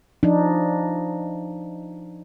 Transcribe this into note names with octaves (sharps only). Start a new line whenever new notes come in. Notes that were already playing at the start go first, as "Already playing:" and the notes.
F3 D4 D#4